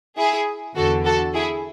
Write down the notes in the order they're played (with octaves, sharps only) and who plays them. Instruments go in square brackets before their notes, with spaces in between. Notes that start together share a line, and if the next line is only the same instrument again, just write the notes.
[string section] E4 G#4
E2 D3 F#4 A4
F#4 A4
E4 G#4